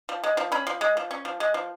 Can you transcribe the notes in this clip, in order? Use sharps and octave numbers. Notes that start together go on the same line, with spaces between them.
F3
G#3
F3
C#4 B5
F3
G#3
F3
C#4
F3
G#3
F3